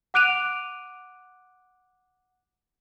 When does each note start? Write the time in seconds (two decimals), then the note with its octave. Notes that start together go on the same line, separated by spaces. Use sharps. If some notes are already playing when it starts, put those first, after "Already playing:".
0.14 F#5 D6 F#6 D7 D#7 F7